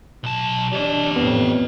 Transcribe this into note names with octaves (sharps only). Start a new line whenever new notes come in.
B1 A5
D4 G4 D#5
F2 A2 B3